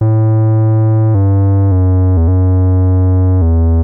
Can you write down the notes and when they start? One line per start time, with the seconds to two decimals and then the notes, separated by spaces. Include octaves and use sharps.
0.01 A2
1.15 G2
1.71 F#2
2.17 E2
2.28 F#2
3.42 E2